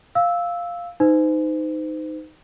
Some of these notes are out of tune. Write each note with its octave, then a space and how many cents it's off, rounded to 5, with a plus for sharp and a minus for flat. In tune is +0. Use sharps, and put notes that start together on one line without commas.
F5 +0 E6 -10
D#4 +0 C5 -40